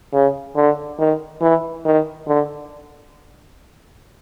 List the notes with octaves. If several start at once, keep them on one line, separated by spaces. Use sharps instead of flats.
C#3
D3
D#3
E3
D#3
D3